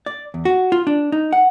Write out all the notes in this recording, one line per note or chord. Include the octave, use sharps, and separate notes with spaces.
D5
E2
F#4
F4
D4
D#4
F#5